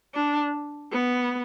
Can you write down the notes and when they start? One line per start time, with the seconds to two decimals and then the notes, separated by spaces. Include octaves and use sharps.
0.14 D4
0.92 B3